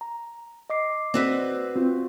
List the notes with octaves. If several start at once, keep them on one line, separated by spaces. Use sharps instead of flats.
A#5
D#5 D6 C7
C4 F#4 B4 C5 D5
C4 F4 F#4